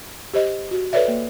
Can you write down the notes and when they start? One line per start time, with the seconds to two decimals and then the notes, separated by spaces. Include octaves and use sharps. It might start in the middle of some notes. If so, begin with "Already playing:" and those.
0.34 G4 C5 D#5
0.71 F#4
0.93 A4 B4 C#5 D5 E5
1.08 A#3